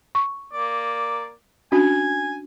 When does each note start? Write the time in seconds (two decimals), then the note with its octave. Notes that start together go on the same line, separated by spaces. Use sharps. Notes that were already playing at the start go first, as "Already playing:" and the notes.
0.15 C#6
0.53 A#3 D5
1.72 C#4 D4 F#4 G#5